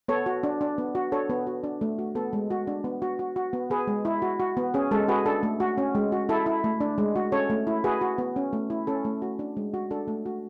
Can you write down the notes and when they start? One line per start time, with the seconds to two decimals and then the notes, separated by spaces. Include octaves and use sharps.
0.08 B3 A4 C#5
0.26 F#4
0.43 D4
0.61 D4
0.78 B3
0.95 F#4
1.12 D4 A4 C#5
1.30 B3
1.47 F#4
1.64 D4
1.81 A3
1.99 F#4
2.15 B3 A4
2.33 G#3
2.51 F#4
2.67 D4
2.84 B3
3.02 F#4
3.19 F#4
3.36 F#4
3.53 B3
3.70 B3 G#4 B4
3.87 G#3
4.05 E4
4.22 F#4
4.40 F#4
4.57 B3
4.74 C#4 G#4
4.91 G#3 A4
5.08 F#4 G#4 B4
5.25 D4 A4
5.43 A3
5.60 F#4
5.78 C#4
5.95 G#3
6.12 F#4
6.29 E4 A4
6.46 E4
6.64 A3
6.80 D4
6.98 G#3
7.16 F#4
7.32 C#4 A4 C#5
7.50 A3
7.67 E4
7.84 F#4 G#4 B4
8.01 F#4
8.18 B3
8.36 C#4
8.53 A3
8.70 E4
8.87 C#4 A4
9.05 A3
9.22 F#4
9.39 D4
9.57 G#3
9.74 F#4
9.91 D4 A4
10.08 A3
10.26 F#4